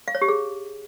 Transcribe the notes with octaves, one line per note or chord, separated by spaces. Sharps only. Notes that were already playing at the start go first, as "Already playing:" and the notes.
F5
C#5
G4
G#4